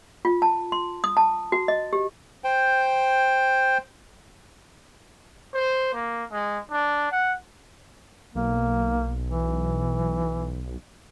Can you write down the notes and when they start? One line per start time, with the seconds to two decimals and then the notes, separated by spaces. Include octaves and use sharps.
0.25 F4
0.42 A5
0.72 C6
1.04 D#6
1.17 A5
1.52 F#4
1.68 D#5
1.93 G4
2.44 C5 G5
5.53 C5
5.93 A#3
6.31 G#3
6.71 D4
7.12 F#5
8.35 B1 A#3
9.29 E3